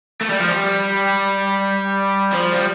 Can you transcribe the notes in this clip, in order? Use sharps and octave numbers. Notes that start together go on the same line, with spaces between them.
A3
G3
F3
G3
F3
G3